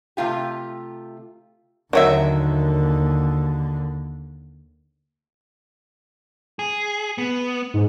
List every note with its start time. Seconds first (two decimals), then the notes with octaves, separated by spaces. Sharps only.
0.17 C3 A3 F4 G4
1.93 D#2 D3 D#3 F#3 E5
6.59 G#4
7.18 B3
7.74 G#2